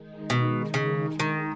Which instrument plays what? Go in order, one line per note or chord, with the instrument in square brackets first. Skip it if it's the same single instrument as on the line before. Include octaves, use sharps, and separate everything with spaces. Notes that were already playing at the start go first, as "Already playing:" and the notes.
Already playing: [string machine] D#3 G#3 D#4
[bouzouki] B2
C#3
D#3